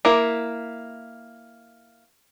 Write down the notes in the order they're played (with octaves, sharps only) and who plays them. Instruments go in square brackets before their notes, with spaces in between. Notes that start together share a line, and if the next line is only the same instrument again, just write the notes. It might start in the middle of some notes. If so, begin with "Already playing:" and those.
[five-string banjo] A#3 E4